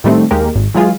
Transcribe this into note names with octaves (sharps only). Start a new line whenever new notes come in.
A2 D#3 G3 A3 C4
D#2 G#3 A#3 G4 A#4
G#1
E3 F#3 G#3 F4 G#4